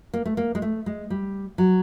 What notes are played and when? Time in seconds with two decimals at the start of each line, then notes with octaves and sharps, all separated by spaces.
0.14 A#3
0.26 A3
0.37 A#3
0.55 G#3
0.62 A3
0.86 G#3
1.10 G3
1.58 F#3